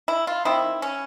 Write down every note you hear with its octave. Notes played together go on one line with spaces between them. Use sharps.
E4
F4
D#3 G3 C4 E4
C#4